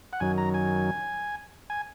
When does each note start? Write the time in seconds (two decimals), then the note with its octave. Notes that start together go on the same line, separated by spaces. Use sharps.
0.13 F#5
0.20 F#2 D#3 F#3 G#5
0.38 A#5
0.54 G#5
1.70 G#5